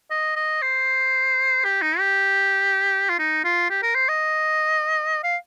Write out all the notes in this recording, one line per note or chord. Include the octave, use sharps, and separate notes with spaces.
D#5
D#5
C5
G4
D#4
G4
F4
D#4
F4
G4
A#4
C5
D#5
F5